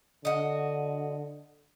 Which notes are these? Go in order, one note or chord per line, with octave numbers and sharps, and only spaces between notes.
D3 F#4 D#5